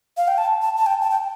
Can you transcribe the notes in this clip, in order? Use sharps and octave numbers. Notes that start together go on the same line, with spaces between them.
F5
G5
A5
A5
A5
G5
A5
G5